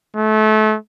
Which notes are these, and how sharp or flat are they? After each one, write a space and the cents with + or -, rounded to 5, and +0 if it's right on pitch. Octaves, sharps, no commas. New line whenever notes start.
A3 -30